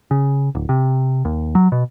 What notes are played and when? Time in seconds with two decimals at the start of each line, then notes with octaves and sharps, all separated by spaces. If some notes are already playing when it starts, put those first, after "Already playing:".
0.11 C#3
0.55 D1
0.69 C3
1.25 D#2
1.55 F#3
1.72 B2